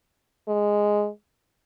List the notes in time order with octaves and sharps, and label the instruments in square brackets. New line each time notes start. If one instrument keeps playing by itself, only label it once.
[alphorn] G#3